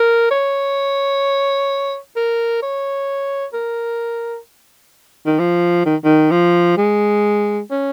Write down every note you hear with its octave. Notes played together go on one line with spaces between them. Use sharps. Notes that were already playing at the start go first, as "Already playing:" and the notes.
Already playing: A#4
C#5
A#4
C#5
A#4
D#3
F3
D#3
D#3
F3
G#3
C#4